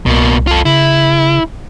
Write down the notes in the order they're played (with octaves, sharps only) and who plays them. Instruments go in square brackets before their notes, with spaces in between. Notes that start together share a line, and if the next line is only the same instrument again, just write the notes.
[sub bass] C2 [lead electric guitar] B2 A#3
[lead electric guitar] F4 A4
[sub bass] C#3 [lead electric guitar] E4